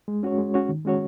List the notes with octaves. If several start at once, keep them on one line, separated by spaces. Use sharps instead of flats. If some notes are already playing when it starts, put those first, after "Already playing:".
G#3
C#4 F#4 C#5
G#3
C#4 F#4 C#5
D#3
G#3 C#4 F#4 C#5